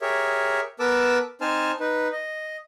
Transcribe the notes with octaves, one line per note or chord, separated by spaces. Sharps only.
G4 G#4 A#4 C#5 E5
B3 A#4 B4 A5 D6 E6
C4 D#4 C5 G#5 A5 F6
D#4 B4
D#5